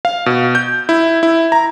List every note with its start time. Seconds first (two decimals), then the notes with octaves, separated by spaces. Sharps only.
0.05 F5
0.26 B2
0.55 G6
0.89 E4
1.23 E4
1.52 A#5